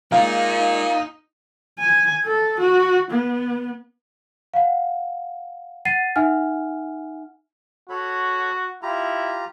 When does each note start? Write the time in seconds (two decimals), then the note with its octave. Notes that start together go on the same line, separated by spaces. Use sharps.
0.12 A#2 G#3 D#4 F5
1.79 G#5
2.25 A4
2.60 F#4
3.10 B3
4.54 F5 F#5
5.85 F#5 A6 C7 D#7
6.16 D#4 E5 F#5 G#5 F6
7.89 F#4 A4 C#5 B5
8.83 E4 F4 G4 A#5